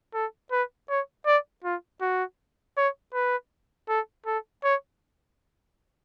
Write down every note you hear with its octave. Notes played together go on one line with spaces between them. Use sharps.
A4
B4
C#5
D5
F4
F#4
C#5
B4
A4
A4
C#5